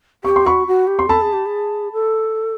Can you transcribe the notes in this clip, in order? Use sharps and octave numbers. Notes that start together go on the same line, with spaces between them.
G4 C#6
C6
F#4 B5 C#6
F#4
G4
C6
A4 A5 B5
G#4
G4
G#4
A4